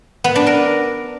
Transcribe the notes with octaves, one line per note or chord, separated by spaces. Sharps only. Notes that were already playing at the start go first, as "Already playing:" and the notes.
B3
D4
A#4